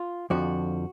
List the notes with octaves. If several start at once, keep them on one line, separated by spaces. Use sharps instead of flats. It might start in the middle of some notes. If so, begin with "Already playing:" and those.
Already playing: F4
F2 D3 F3 F#4